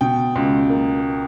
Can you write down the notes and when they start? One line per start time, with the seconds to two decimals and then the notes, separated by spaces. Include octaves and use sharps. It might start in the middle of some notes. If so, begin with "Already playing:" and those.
0.01 B2 G5
0.36 C#2
0.70 A#3